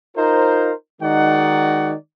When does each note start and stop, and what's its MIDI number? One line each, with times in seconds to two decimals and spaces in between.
0.17 0.72 63
0.17 0.72 65
0.17 0.72 70
0.17 0.72 72
1.02 1.93 51
1.02 1.93 56
1.02 1.93 63
1.02 1.93 66
1.02 1.93 74
1.02 1.93 78